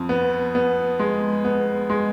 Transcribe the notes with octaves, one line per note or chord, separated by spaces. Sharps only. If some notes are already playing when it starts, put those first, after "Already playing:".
Already playing: F2
B3
B3
G#3
B3
G#3